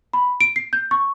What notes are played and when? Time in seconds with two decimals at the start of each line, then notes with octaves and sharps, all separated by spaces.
0.13 B5
0.41 D7
0.56 C7
0.73 G6
0.91 C#6